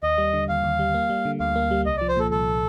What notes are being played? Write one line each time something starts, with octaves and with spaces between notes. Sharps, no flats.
D#2 D#5
G3
D3
D#2 F5
D#2
G3
A#3
G3
D3
D2 F5
A#3
G3
C2 D#5
F3 D5
C5
A#2 A4
C2 A4